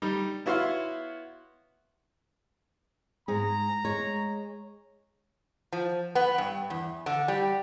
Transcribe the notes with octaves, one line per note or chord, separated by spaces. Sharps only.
G3 D#4
B3 E4 F#4 C#5 F5 C6
G#2 G#4 A#5
G#3 C#5
F3
B3
G2
E2
D3
G3